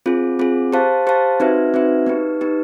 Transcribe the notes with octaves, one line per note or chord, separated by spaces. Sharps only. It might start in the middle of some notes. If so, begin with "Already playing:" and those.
C4 F4 G#4
C4 F4 G#4
G4 C5 F5 A5
G4 C5 F5 A5
C4 D#4 F#4 B4 E5
C4 D#4 F#4 B4 E5
B3 D#4 G4 B4
B3 D#4 G4 B4